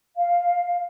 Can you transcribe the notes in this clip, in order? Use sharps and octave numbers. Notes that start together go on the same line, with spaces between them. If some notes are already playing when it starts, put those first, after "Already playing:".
F5